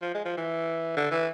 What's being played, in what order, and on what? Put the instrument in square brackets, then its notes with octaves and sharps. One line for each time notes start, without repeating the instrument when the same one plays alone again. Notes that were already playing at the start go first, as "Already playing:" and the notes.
[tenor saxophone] F3
G#3
F3
E3
D3
E3